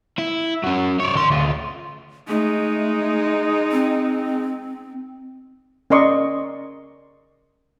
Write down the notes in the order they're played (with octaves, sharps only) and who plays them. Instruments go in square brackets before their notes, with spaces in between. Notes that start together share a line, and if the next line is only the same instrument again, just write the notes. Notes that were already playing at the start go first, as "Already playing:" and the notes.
[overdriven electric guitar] E4
F#3 C#4
C#5 D5
D#3 C6
D2 F4
[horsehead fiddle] G#3 D#4 [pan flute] A3
[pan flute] C4
[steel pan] C#4 A#4 D5 D#5 C6 C#6